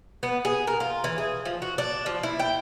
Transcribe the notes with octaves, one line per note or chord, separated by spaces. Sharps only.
B3
G#4
A#4
F4
E3
G#4
F3
F#4
D4
F3
E4
G5